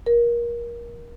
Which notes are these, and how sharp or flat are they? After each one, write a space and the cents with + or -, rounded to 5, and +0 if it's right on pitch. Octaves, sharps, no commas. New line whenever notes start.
A#4 +25